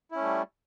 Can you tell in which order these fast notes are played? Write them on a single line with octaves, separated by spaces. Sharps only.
E4 C#4 A3 G3